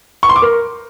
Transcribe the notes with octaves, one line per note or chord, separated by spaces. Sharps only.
C#6
C6
D6
A#4